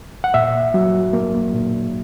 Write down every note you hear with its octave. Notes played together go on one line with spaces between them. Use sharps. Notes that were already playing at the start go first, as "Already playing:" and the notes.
F#5
A#2 E5
F#3
A#3
A#2